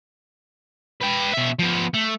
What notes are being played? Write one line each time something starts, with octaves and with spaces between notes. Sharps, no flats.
B4 G5
B2 E5
F3 B3
A3